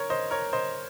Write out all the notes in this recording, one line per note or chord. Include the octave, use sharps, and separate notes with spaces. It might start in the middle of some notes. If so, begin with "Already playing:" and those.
Already playing: A#4 C#5
C5 D#5
A#4 C#5
C5 D#5